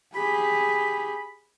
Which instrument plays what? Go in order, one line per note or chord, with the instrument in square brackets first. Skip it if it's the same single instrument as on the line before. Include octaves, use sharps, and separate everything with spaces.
[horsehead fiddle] G4 G#4 [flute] B5